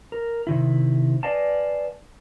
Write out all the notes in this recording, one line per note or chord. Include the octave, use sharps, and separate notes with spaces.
A#4
C3 D#3 E4
B4 D5 D#5 F5 G#5 A5